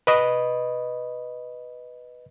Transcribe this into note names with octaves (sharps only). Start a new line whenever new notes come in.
B4 D#5